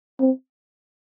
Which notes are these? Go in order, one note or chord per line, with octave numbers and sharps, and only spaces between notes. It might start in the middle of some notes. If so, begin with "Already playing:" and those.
C4